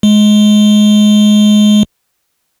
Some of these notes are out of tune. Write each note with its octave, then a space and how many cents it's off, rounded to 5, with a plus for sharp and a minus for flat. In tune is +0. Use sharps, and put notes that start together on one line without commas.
G#3 +20